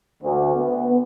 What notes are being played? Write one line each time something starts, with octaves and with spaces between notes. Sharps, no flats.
D2
B3